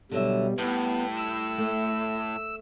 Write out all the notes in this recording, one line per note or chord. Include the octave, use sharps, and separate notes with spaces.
B2 D3 F#3 G3 E5
A2 G3 B3 G4
E6
A3